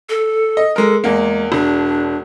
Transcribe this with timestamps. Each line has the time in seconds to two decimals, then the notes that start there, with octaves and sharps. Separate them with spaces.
0.09 A4
0.57 D#5
0.76 G#3 A4 A#4
1.04 E2 G#3 A#3
1.52 E1 D4